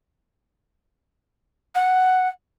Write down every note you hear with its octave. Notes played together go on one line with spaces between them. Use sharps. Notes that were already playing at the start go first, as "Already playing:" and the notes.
F#5